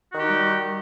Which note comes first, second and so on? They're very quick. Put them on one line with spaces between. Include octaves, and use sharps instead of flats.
F#4 D#3 G4 D#4 G3